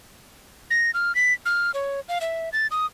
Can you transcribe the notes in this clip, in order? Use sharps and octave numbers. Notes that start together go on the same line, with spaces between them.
A#6
F6
B6
F6
C#5
F5
E5
A6
D#6